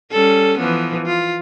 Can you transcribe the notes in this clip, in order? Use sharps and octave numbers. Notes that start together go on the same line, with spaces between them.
G3 C#4 A4
E3 F3 B3
F4